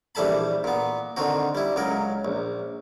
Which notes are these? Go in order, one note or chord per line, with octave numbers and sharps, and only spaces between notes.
A#1 E3 G3 A4 A5 B5
A#2 B3
D3 D#3 C4 F#4
G3 E4
C#2 C#3 F#3 A#4
A#1